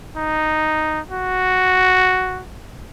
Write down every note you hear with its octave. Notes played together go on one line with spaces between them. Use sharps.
D#4
F#4